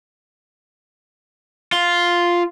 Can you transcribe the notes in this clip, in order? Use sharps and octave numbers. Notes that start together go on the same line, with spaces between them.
F4